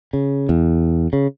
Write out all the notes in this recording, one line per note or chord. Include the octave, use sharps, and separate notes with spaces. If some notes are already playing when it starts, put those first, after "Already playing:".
C#3
E2
C#3